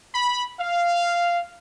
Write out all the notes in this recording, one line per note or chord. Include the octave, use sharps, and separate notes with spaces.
B5
F5